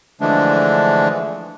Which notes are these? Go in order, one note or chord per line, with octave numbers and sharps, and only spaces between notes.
D3 E3 F3 G#3 A3 D4